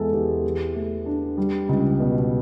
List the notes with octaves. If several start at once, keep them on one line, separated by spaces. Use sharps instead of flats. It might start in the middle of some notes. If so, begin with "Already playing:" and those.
Already playing: E2 G#3 G#4 A4
E2 G4
E3
A3
D4
G3
C#2
B2